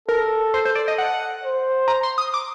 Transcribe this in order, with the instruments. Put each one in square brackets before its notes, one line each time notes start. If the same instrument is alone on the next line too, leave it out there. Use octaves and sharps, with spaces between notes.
[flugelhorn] A4 [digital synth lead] A#4
[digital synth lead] C5
C5
D5
D#5
F#5
[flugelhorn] C5
[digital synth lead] A#5
C6
D#6
D6